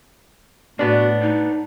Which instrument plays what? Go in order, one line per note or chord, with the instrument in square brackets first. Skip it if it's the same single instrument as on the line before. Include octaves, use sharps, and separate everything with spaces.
[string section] A2 [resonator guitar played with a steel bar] B3 D4 [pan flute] F#4
[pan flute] D#4